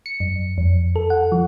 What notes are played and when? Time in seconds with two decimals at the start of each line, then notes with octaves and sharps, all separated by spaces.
0.06 C#7
0.20 F#2
0.58 F2
0.96 A4
1.10 F#5
1.32 F3